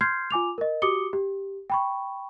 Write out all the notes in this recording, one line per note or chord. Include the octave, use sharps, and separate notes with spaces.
C6 F6 G6 G#6 C7
F4 G#5 D6 F7
A#4 D#5
F#4 G4 D6 D#6 C#7 G7
G4
G5 B5 C#6